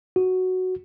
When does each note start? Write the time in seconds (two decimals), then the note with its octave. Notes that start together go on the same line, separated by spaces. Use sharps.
0.16 F#4